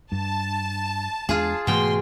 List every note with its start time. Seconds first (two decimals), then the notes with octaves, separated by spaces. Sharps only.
0.12 G2 A5
1.29 E2 G#3 D4 F4 G#4
1.67 G#2 B2 E3 A3 G#4 G5 C6